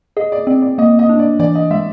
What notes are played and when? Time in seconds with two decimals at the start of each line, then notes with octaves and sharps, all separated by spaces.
0.17 G#4 D#5
0.32 D5
0.47 C4 D5
0.62 D5
0.78 A#3 D#5
0.99 D#5
1.09 D4
1.19 D5
1.39 E3 D5
1.55 D#5
1.71 G#3 E5